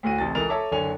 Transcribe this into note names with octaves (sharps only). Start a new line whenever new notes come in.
D2 A2 F#4 D#7
A1 C3 A5 A6
C#2 E3 A4 A#4 A6 F7
A4 C#5 E5 A5 A#5 D6
F#1 D3 C#5 G#5 F7